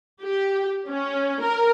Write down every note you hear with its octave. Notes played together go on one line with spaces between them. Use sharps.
G4
C#4
A#4